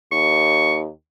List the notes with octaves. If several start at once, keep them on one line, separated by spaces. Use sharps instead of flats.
D#2 C#6